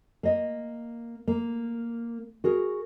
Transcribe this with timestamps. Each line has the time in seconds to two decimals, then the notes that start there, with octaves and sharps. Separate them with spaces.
0.23 A#3 D#5
1.27 A#3
2.44 F#4 G#4 A#4